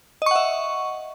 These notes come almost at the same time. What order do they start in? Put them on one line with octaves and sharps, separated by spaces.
D#5 C#6 F#5 E5